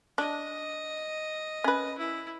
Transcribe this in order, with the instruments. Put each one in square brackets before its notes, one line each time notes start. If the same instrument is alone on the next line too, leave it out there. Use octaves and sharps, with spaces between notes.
[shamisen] D4 [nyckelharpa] D#5
[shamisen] C#4 B4
[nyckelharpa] E4